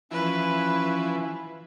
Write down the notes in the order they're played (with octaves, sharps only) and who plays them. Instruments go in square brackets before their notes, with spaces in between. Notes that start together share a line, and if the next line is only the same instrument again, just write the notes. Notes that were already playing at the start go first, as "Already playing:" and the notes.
[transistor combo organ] E3 F3 E4 [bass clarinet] C#4 [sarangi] B4